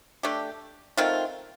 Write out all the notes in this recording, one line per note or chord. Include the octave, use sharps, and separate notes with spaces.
A3 D4 G4
D#3 A3 C4 F4